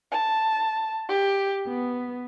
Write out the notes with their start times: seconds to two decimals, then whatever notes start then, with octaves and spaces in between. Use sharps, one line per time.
0.11 A5
1.07 G4
1.66 B3